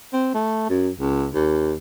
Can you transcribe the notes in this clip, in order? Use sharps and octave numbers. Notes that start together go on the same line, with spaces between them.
C4
A3
F#2
C#2
D#2